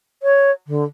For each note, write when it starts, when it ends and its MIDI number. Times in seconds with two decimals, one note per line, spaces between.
0.23 0.51 73
0.67 0.84 50